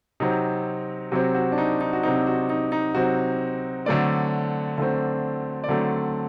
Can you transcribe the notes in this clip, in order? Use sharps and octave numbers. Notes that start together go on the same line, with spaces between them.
C3 F#3 C4 D#4
C3 F#3 C4 F#4
F#4
D4
D#4
D#4
F#4
C3 F#3 C4 D#4
F#4
D#4
D#4
C3 F#3 C4 F#4
D3 F#3 A3 C4 D5
D3 F#3 A3 C4
D5
D3 F#3 A3 C4 C5